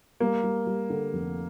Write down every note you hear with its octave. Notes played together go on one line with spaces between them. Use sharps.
G3 A#3
G3
G3
D3
F1